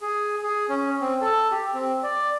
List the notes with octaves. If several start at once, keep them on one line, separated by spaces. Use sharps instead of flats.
G#4
G#4
C#4
C4
A4
G4
C4
D5